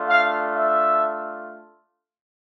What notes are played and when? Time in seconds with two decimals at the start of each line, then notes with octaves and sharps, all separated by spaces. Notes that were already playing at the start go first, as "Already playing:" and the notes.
Already playing: A3 D4 F4
0.08 F5
0.53 E5